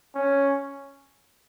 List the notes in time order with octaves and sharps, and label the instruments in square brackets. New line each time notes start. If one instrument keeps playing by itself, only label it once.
[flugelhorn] C#4